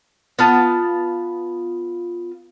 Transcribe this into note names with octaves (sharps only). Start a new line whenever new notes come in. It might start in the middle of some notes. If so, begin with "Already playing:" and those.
B3 F4 A5